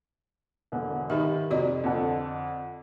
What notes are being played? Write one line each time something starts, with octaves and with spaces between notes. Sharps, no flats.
E1 D3
D#3 D#4 G4 E5
F2 C3 F#4 D5 D#5
F2 D3 A4